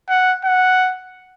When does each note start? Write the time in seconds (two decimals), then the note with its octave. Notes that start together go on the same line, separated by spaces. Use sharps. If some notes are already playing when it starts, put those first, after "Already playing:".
0.09 F#5
0.45 F#5